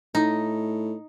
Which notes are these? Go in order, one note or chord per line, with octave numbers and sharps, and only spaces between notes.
A2 D#4